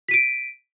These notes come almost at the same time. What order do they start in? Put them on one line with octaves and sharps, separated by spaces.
B6 D#7 D7